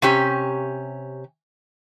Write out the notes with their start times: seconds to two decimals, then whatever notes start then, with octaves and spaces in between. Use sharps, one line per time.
0.02 C3 C#4 G4